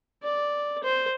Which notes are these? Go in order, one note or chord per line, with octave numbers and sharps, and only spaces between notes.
D5
C5